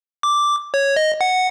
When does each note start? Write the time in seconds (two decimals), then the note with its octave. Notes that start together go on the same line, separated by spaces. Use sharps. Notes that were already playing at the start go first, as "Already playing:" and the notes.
0.23 D6
0.74 C#5
0.96 D#5
1.21 F#5